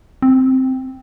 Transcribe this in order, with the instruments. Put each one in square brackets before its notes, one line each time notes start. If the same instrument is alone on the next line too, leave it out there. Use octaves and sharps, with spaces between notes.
[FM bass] C4